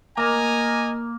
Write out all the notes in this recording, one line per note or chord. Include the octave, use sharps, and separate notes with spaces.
A#3 D#5 G#5 A#5